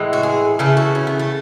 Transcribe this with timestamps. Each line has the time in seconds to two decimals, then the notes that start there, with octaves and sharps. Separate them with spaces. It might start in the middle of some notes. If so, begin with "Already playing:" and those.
Already playing: A2 E3 G#3
0.13 F#4
0.23 G#4
0.59 C#3 E3 A3 A4
0.77 F#4
0.95 C#4
1.07 B3
1.19 A3